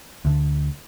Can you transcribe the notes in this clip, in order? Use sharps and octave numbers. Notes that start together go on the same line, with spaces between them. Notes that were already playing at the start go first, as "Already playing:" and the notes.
D2 D3